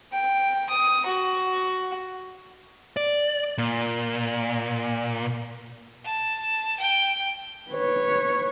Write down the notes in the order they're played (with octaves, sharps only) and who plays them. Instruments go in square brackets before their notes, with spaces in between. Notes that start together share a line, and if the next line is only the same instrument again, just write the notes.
[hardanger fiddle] G5
D#6
F#4
[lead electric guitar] D5
A#2
[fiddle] A5
G5
[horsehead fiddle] B4 C#5